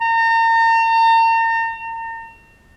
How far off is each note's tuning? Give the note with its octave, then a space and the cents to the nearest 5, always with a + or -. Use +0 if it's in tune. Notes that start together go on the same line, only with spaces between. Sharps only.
A#5 -40